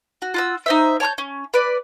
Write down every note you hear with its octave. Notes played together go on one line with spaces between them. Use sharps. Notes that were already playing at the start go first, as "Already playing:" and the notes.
F#4
F4 F#4 E6
D#4 C5 E5
C#5 A5 C#6 G6
C#4
B4 D5